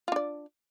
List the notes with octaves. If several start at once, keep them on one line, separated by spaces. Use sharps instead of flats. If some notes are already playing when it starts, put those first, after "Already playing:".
D4 F4 D5